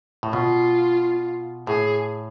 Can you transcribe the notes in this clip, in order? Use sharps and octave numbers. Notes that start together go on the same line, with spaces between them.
A2
B2 F4
A2 G#4